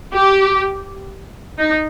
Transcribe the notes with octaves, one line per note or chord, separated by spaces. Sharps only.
G4
D#4